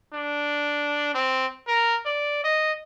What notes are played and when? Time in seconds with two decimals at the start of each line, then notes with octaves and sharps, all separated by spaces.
0.14 D4
1.14 C4
1.68 A#4
2.05 D5
2.44 D#5